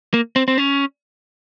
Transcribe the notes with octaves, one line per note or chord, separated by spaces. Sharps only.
A#3
C4
C4
C#4